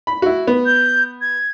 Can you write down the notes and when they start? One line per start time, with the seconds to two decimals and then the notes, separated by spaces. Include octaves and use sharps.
0.07 B5
0.22 E4 F#4
0.47 B3
0.66 G6
1.21 G#6